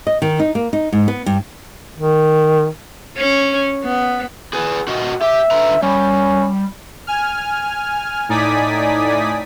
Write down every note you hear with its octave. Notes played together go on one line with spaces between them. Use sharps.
D#5
D#3
D#4
A#3
D#4
G#2
B3
G2
D#3
C#4
B3
G#4 B4
F#4 A#4 D#5
G4 E5
D3 B4 A#5
G3 C#4
G#5 F6
A2 D#4 D5 G#5 D#6 B6